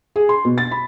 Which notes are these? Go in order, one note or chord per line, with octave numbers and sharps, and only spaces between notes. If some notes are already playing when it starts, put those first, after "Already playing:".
G#4
C6
B2
A6
B5